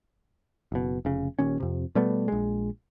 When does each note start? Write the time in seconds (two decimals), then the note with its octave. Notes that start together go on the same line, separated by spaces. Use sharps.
0.72 F#1 B2
1.05 F1 C#3
1.39 D#1 D#2 C#4
1.60 F2 C3
1.95 B2 G3 A3 B3
2.28 A#1 G#3